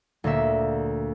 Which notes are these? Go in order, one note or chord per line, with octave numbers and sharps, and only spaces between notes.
D2 A#2 A#3 E5